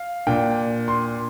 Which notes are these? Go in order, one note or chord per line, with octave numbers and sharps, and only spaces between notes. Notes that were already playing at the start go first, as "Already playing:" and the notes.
Already playing: F5
A#2 A#3 D4 G5
C6